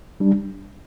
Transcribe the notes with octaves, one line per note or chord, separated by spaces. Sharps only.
G3 D4